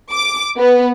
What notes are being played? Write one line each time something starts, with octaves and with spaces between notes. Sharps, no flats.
D6
B3